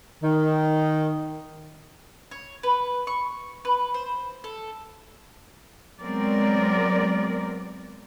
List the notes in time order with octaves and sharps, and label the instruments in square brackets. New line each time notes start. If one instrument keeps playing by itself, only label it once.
[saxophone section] D#3
[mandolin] C#5
B4
C#6
B4
C5
A4
[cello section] F#3 G#3 B3 C4 A#4 D5